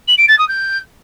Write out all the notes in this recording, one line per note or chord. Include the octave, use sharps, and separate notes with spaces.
F#7
D7
A6
D#6
G6